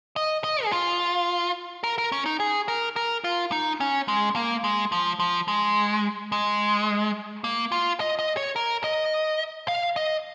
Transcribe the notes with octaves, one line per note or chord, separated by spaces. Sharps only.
D#5
D#5
G#4
F4
A#4
A#4
C#4
D#4
G#4
A#4
A#4
F4
D#4
C#4
G#3
A#3
G#3
F3
F3
G#3
G#3
A#3
F4
D#5
D#5
C#5
A#4
D#5
F5
D#5